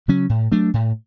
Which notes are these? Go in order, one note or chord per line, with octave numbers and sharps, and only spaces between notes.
C#3 F#3 C#4
A2
F#3 A3 D4
A2